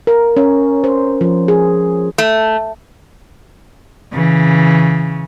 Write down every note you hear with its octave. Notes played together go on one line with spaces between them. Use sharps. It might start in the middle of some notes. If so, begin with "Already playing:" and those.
A#4
C#4
C5
F3
G#4
A3
C#3 E3